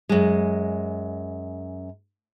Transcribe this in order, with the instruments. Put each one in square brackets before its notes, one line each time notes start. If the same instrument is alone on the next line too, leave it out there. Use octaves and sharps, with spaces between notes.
[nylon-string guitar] F#2 G#3